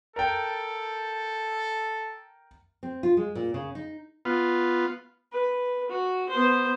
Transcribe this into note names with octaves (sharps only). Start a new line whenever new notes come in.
A4 A#4 G5
C4
F4
G#3
A#2
C#3
D#4
B3 F4
B4
F#4
B3 C5